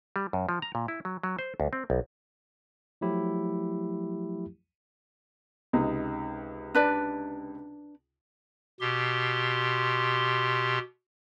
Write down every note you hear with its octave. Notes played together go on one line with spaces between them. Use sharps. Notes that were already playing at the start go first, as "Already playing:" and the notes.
G3
F#2
F3
A#5
A#2
E4
F#3
F#3
C5
D2
C4
B1
F3 F#3 A3 E4 G4
C#2 C3 D#4
D4 B4 D5
B2 G4 C6